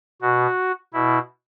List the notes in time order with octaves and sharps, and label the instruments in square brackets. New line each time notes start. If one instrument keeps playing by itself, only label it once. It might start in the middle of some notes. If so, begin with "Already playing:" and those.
[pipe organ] B2 F#4
B2 E4